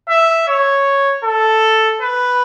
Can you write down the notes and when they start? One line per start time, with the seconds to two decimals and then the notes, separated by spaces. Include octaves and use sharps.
0.09 E5
0.48 C#5
1.24 A4
2.02 B4